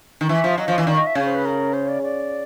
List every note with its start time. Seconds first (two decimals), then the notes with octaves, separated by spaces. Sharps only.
0.21 D#3
0.29 E3 E5
0.44 F3
0.58 F#3 D#5
0.68 F3
0.78 E3
0.87 D#3 D5
0.96 D#5
1.07 E5
1.15 C#3 C#5
1.25 C5
1.35 B4
1.45 A#4
1.73 C5
1.88 D5
2.03 D5